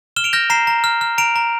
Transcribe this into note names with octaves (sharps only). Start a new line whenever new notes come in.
F6 E7 G7
D7 F7
F6 G6 A#6
A#5 C7 E7
A#5
F6
F6
A#5 D7 F7
A#5